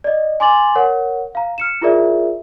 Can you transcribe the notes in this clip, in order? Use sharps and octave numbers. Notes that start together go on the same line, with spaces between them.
D5 D#5
G#5 C6 D6 A6 F#7
A#4 C#5 F#5
F5 A#5
F6 C#7 E7
E4 F4 G#4 A#4 D5 E5